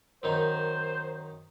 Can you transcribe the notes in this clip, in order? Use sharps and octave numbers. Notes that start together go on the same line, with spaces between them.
F#2 D#3 D#4 C5